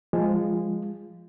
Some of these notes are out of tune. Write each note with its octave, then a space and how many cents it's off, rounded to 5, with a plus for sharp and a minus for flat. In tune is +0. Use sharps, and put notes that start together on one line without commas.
F3 +0 G#3 -15 F4 -5